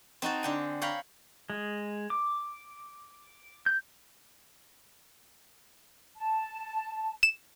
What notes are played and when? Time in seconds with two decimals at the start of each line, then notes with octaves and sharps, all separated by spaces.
0.22 C4 D#4 F#4 A5
0.43 D3 G5 G#5
0.81 C#5 F5 G5 A#5 B5
1.50 G#3
2.10 D6
3.66 G6
6.16 A5
7.23 E7